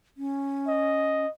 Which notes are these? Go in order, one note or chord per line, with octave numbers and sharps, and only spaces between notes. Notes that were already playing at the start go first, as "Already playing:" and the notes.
C#4
D#5